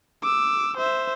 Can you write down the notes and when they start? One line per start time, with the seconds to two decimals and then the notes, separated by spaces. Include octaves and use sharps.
0.23 D6 E6
0.77 C5 E5